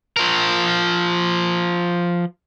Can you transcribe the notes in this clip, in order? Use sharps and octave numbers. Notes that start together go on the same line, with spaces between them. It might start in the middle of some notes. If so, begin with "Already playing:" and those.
F3 A#4